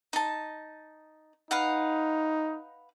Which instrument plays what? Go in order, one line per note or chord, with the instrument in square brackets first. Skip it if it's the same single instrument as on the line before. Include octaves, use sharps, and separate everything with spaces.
[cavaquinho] D#4 A5
[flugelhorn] D#4 [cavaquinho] B4 F5 F#5